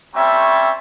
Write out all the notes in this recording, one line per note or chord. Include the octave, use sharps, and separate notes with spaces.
G3 A3 C4 C#4 C#5 E5